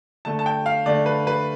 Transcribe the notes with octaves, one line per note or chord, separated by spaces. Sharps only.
D3 A3 A5
A5
G5
F5
D3 A3 D5
B4
B4